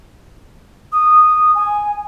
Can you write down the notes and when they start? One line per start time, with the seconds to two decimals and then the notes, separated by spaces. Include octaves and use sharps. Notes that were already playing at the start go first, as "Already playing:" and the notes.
0.92 D#6
1.55 G#5